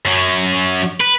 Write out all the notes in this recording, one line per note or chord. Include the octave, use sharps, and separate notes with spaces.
F#2 F#3
B4